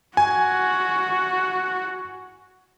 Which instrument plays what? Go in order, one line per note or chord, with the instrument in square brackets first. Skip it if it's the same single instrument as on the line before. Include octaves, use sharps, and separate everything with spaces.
[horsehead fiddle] F#4 [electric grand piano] G#5